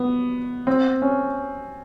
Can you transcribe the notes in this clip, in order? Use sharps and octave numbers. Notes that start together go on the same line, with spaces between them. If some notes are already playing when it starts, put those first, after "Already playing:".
Already playing: B3
C4
C#4